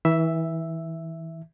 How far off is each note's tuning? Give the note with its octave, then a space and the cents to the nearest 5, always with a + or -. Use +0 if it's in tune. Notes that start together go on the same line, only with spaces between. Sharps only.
E3 -30 E5 +0